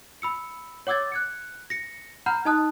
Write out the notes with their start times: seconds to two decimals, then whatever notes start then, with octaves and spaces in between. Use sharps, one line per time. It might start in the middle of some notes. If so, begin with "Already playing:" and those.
0.22 B5 E6 C#7
0.87 C#5 F#5 D6 E6 G#6 A6
1.12 F#6 G#6 C#7
1.70 A#6 C#7
2.26 F#5 A#5 B5 F6 G6
2.45 D#4 D#5 A5 D#6 F#6